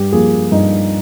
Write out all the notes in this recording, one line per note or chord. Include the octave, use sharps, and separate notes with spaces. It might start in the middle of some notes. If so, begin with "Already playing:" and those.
Already playing: G2 G4
F3 A#3 G#4
G2 D#4